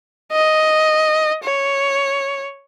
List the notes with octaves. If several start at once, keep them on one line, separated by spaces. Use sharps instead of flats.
D#5
C#5